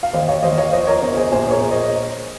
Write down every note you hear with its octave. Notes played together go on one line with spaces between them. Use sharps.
F5
D#2 C5 D#5
C#5 F5
D#2 C5 D#5
C#5 F5
F3 C5 D#5
A#4 C#5
G1 C5 D#5
G#4 C5
A#1 G#4 C5
C5
A#4 C#5
A#1
C5 D#5